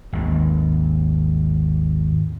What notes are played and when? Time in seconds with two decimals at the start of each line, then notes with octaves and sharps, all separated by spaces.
0.13 G#1 D#2